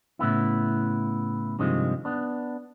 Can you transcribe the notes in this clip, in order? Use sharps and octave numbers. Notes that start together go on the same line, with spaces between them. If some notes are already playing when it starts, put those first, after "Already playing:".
A2 C#3 B3 E4
G2 C3 D#3 F3 G#3
B3 D4